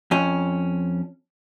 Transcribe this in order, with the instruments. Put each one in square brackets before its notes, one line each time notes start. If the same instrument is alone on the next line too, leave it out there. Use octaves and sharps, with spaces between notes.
[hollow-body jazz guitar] F2 C#4